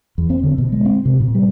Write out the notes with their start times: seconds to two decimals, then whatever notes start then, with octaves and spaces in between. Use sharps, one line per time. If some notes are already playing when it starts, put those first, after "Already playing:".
0.18 E2
0.30 C4
0.44 D3
0.58 B2
0.72 G#3
0.85 C4
1.06 C3
1.20 A#2
1.35 G3